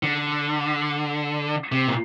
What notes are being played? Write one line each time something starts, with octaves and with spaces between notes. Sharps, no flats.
D3
C3
A#2